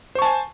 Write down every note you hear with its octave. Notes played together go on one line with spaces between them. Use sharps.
C5 G#5 A5 C#6